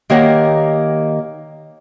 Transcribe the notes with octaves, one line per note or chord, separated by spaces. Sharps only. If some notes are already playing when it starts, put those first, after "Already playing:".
D#3 A#3 G4 C#5 F#5